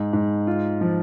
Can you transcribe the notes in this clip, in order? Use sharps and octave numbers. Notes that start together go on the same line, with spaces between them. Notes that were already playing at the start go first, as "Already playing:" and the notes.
Already playing: G#2
G#2
F4
F3